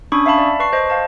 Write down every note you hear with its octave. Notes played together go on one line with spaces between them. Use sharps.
C#4 D4 B5 C#6 D#6 G#6
E5 F5 A5 B5
D5
B4 A5 C#6 C7
C5 D#5
F5 A5